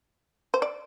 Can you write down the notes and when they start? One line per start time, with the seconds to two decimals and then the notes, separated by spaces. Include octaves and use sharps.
0.54 C5
0.62 D5